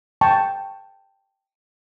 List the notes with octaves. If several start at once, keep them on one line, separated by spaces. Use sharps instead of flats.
G5 A5 C#6